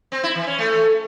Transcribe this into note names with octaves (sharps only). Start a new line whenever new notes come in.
C4
E4
E3
C#4
A3